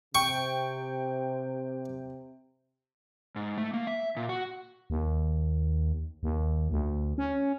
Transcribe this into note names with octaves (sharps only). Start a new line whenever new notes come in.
C3 G5 C#6
G#2
A3
A#3
E5
A#2
F#4
D#2
D#2
D2
C#4